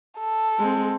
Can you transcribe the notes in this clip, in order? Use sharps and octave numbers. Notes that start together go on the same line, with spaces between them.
A4
G#3 C4